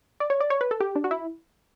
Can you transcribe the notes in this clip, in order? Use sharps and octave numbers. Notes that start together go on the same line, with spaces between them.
D5
C#5
D5
C#5
B4
A4
G4
D4
F#4
E4